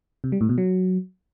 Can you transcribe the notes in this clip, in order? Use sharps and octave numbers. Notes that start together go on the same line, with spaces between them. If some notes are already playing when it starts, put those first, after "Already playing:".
C3
G3
A2
B2
F#3